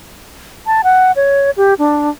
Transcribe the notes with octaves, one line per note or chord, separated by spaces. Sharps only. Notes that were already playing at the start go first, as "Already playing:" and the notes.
A5
F#5
C#5
G4
D4